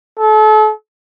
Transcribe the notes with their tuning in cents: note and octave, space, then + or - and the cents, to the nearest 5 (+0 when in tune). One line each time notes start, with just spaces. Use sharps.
A4 -35